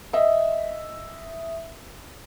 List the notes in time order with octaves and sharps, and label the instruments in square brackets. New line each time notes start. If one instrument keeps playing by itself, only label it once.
[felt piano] D#5 E5